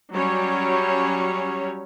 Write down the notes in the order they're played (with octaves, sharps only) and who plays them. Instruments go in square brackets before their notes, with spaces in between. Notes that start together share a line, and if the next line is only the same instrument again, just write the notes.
[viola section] F#3 G3 C#4 C#5